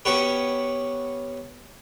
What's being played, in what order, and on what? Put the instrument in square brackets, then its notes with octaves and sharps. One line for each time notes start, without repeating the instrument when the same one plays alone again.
[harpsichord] B3 C#4 F#4 G4 B4 C#5